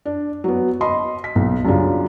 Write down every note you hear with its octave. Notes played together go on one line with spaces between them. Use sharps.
D4
F#3 B3
D#5 B5 C6
B6
B1
F#2 C#3 G3 D4 F4